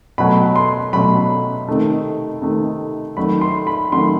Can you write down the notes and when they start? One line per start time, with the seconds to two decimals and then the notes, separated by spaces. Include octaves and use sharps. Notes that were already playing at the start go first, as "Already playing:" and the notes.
0.18 B2 F#3 A3 B5
0.56 C6
0.93 B2 F#3 A3 B5
1.68 C3 D#3 A3
2.42 C3 D#3 A3
3.17 D#3 F#3 A3 B5
3.41 C6
3.67 B5
3.92 D#3 F#3 A3 C6